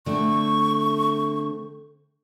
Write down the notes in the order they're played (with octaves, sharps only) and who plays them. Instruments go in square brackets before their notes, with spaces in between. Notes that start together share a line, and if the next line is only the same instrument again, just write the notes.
[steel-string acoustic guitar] D3 A3 C4 [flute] C#6